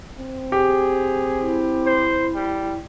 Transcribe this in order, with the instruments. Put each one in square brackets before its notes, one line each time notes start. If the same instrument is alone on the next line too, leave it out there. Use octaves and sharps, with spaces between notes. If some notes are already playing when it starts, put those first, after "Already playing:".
[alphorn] C4
[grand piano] G4 [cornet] G#4
[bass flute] E4
[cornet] C5
G3